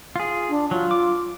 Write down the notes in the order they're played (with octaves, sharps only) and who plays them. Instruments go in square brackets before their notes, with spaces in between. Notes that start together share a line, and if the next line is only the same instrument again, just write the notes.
[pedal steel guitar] F4 G#4
[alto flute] D4
[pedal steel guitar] F#3 [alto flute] F4
[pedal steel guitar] D6